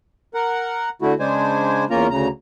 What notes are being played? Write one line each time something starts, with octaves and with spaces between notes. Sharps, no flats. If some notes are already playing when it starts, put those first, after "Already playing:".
A#4 F#5
D3 A3 E4 F#4
C#3 G#3 D4 C5 G#5
E2 A#3 C#4 F4 A#4 A#5
D2 C#3 A#5